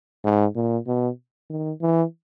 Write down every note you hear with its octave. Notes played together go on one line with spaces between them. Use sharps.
G#2
A#2
B2
D#3
E3